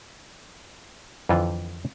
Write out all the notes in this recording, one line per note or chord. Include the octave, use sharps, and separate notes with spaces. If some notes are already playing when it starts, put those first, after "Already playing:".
F2 D3 E3 F4